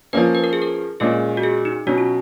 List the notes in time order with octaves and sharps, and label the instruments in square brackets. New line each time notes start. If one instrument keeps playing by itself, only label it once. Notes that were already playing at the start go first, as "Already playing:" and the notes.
[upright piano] F3 A#3 C#4 [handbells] B4
[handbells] B4
A#4
G#4
A#4
[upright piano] A#2 G#3 C#4 [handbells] G#4
[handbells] F#4
G#4
D#4
[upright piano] B2 F#3 C#4 [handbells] F#4
[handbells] F4